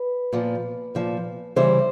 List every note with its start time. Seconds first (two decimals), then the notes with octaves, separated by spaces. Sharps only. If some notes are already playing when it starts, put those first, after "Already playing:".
Already playing: B4
0.33 A#2 F3
0.95 A#2 F3
1.56 C#3 E3 G3 C5